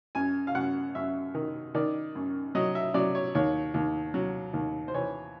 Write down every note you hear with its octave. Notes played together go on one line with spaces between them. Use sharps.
F#2 G#5
F5
F#2 F#5
F#2 E5
D#3
D#3 D5
F#2
F#3 D#5
E5
F#3 D5
C#5
D#2 C#5
D#2
F#3
D#2
C5
E3 C#5